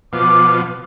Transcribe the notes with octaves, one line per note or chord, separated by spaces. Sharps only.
B2 F3 D6